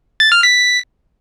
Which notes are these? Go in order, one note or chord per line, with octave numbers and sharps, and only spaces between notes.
A6
F6
B6